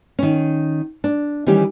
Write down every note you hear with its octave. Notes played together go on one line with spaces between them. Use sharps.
D#3 C#4
D4
D#3 E3 G3 C#4 G4